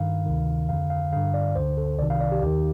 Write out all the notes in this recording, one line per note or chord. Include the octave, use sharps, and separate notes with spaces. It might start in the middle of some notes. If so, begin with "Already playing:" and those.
Already playing: G2 D#3 F5
D2 C3 D#3
F2 D3 F5
F5
G2 D3 F5
D5
D2 D3 C5
A4
C2 C3 D#3 D5
F5
D5
G4
D#2 D#3 G4